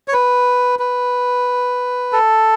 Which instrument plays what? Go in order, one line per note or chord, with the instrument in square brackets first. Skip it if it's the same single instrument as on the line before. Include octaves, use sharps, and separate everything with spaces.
[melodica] C#5
B4
B4
A4